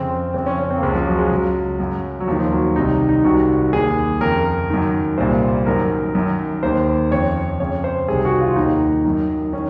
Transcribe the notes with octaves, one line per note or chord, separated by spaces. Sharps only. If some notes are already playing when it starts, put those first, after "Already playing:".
Already playing: F2 C#3 C4
F2 C#3 C4
C#4
C#4
C4
A#3
C#2 C#3 G#3
F3
F#3
G#3
C#2 C#3 F#3
F#2 C#3
F#3
D#2 D#3 F3
F#3
C2 C3 D#3 D#4
D#4
C2 C3 D#3 F#4
D#2 D#3 G#4
F2 C#3 A#4
F#2 D#3
C2 A#2 C5
F#2 D#3 A#4
F#2 D#3
D#2 D#3 C5
F2 C#3 C#5
F2 C#3 C#5
C5
C2 C3 D#3 G#4
F#4
F4
D#2 D#3 D#4
F#2 D#3
D#3 C#4